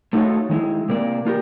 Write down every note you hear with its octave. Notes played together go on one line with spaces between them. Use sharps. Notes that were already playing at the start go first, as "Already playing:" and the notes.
A3 D#4 F4 F#4 A4 C#5
D#3 G#3 E4
C3 A#3 D5
A#3 F4 G4 A#4